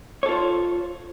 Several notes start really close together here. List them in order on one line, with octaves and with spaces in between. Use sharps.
C#5 A4 F4 C5